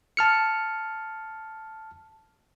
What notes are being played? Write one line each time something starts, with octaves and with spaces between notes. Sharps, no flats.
A5 F6 C#7